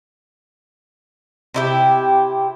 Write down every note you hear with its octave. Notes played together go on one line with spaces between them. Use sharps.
C3 E4 G4